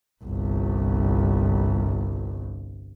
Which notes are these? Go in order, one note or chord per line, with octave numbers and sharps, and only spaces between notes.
G1 C2